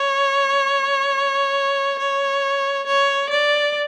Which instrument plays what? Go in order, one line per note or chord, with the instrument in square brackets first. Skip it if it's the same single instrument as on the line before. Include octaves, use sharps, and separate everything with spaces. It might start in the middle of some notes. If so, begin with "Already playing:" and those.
Already playing: [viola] C#5
C#5
C#5
D5